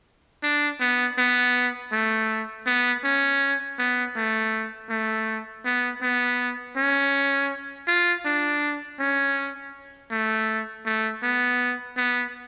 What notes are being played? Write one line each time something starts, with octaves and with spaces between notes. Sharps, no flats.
D4
B3
B3
A3
B3
C#4
B3
A3
A3
B3
B3
C#4
F4
D4
C#4
A3
A3
B3
B3